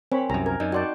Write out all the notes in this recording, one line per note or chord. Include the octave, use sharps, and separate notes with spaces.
C4 A#4 C5 C#5 G#5 B5
C2 F#2 G#5 A#5
A#4 G#6
F#2 D#4 D5 D#5
F#4 D5 G5 A5 C6 G6